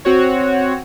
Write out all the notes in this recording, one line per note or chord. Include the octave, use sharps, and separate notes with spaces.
C4 F#4 C#5